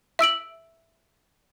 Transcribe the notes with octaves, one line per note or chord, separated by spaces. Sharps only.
E5 E6 D7 F#7